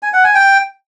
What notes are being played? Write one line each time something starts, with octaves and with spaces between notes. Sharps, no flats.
G#5
F#5
G#5
G5